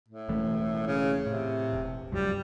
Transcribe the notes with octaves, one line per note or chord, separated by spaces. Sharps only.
A2
E1 E3 A3
C#3
A2 C3
E1
C#2 G2 F#3 G3